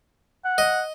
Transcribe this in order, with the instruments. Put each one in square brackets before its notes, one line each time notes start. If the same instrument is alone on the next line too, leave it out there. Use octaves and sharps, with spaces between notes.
[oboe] F#5
[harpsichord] D#5